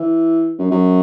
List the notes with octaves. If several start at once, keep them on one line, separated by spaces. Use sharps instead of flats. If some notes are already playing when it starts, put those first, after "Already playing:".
Already playing: E3
F#2
F#2